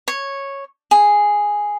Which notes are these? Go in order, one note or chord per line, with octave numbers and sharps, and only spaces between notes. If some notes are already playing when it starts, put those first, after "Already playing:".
C#5
G#4